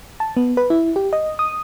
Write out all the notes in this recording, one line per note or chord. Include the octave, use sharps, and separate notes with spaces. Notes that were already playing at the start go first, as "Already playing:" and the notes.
A5
B3
B4
E4
G4
D#5
D#6